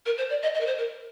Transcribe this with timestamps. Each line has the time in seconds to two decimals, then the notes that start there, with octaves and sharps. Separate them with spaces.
0.06 A#4
0.18 C5
0.30 D5
0.42 D#5
0.54 D#5
0.60 A#4
0.66 C5
0.78 A#4